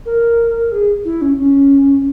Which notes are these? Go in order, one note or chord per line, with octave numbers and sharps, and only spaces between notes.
A#4
G#4
E4
C#4
C#4